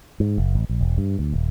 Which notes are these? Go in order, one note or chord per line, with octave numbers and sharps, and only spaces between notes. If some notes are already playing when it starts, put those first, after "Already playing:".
G#2
F#1
A1
A#1
E1
G2
D2
D#1